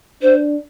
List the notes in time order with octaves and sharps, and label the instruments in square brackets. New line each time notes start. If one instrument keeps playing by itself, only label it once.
[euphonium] D4 [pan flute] C5